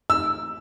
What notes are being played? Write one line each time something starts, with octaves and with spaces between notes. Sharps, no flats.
E6